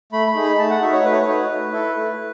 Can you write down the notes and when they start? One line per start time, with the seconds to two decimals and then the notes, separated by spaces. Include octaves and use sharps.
0.13 A3 B5
0.27 B5
0.35 D#4 G#4
0.44 B5
0.58 A3 A5
0.70 F#5
0.81 D#4 F#4 E5
0.92 C#5
1.04 A3 B4
1.13 C#5
1.22 B4
1.27 D#4 F#4
1.50 A3
1.73 E4 A4
1.96 A3